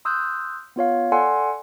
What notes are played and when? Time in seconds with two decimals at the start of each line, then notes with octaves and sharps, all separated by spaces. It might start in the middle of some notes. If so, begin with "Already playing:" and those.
0.05 C6 D#6 E6 F#6 G6
0.76 B3 F4 C#5 F5
1.12 A4 D5 F#5 G#5 C6